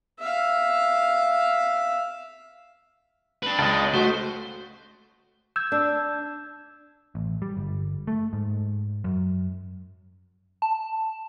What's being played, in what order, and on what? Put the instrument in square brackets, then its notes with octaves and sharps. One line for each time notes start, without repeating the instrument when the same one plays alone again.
[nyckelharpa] E5 F5
[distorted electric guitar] D4 B4
[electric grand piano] C#2 [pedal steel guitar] D#5 A5
[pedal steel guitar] A3 [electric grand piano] F#4 [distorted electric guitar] C5
[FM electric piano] E6 G#6 [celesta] G6
[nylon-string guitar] D4
[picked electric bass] A1
G3
G1
A3
G#2
F#2
[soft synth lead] A5